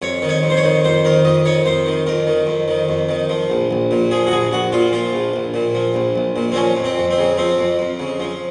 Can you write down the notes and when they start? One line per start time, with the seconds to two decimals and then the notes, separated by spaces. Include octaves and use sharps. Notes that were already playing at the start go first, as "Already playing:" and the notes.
0.02 F2 C#5
0.22 D#3
0.29 C#5
0.43 F2
0.50 C5
0.57 C#5
0.63 D#3
0.85 F2 C5
1.04 D#3 A#4
1.25 F2 D#5
1.45 D#3 C#5
1.66 F2 C5
1.86 D#3
2.07 F2 A#4
2.27 D#3
2.47 F2
2.68 D#3
2.89 F2
3.09 D#3
3.29 F3
3.50 A#1
3.71 A#1
3.91 A#2
4.11 F3 G#4
4.27 F#4
4.31 A#1 G#4
4.51 A#1 F#4
4.72 A#2 F4
4.92 F3 F4
5.13 A#1
5.34 A#1
5.54 A#2
5.75 F3
5.94 A#1
6.16 A#1
6.36 A#2
6.52 C4
6.56 F3 C#4
6.77 F2
6.84 C4
6.98 F2
7.11 C4
7.18 C#3
7.37 F3 C4
7.58 F2
7.79 F2
8.00 C#3
8.20 F3